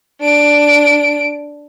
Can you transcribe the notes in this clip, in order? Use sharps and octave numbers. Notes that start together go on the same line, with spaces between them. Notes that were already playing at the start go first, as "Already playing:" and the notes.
D4 D7